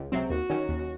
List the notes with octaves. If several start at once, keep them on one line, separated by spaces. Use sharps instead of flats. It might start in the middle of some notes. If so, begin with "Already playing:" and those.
Already playing: C#2
C3 F#3 C4
D#2 F#4
D#3 F#3 C#4
D#2